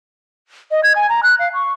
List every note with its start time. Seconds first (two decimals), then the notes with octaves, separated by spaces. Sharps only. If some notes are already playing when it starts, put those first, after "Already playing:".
0.71 D#5
0.83 G#6
0.96 G#5
1.09 A#5
1.23 F#6
1.39 F5
1.54 C#6